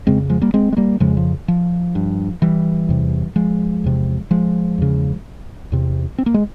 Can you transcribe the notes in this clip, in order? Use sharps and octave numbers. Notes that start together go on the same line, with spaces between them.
F2 C#3 G#3 C4
F3 G#3
G3 A#3
G#3 C4
G#3
G3 A#3
F2 C#3 F3 G#3
F3
F3
G2
E3 G3
E2 C3
F3 G#3
E2 C3
F3 G#3
E2 C#3
E2 C3
C4
A#3
G#3